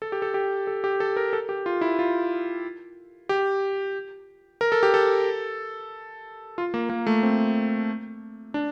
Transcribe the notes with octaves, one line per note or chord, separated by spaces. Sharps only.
A4
G4
A4
G4
A4
G4
A4
A#4
A4
G4
F4
E4
F4
G4
A#4
A4
G4
A4
F4
A#3
A#3
A3
C4
D4